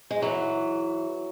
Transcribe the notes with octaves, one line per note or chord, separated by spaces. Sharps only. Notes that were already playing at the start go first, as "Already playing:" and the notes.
G#3
G#2 E3 F#3